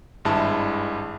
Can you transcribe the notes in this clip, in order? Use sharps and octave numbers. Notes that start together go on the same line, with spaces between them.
G#1 G2 G#3 E4 A5